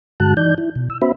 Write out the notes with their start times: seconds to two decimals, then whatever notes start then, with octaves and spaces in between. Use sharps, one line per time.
0.20 G2 D3 G#3 F#4 A5 F#6
0.37 E3 D#4 D5 G6
0.58 E4
0.76 B2
0.90 E6
1.02 B3 C#4 F#4 C5 E5 B5